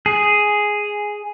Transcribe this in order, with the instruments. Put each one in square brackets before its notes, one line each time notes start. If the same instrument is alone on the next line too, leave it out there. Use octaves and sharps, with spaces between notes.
[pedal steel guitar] G#4